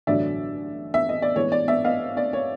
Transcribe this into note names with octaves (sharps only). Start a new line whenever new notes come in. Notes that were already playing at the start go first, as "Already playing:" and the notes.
A1 G2 D3 F#3 D5 E5
E5
D#5
D5
A2 E3 G#3 B3 C#5
D5
D5 E5
D#5 F5
D5
C#5